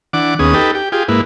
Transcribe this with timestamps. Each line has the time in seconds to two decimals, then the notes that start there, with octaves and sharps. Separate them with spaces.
0.13 E3 D4 F#5 D6
0.39 D#2 B3 C#4 G#4 D#6
0.54 D#4 G4 A4 B4
0.75 G4
0.92 F4 G4 G#4
1.08 G#2 A#3 E4 B4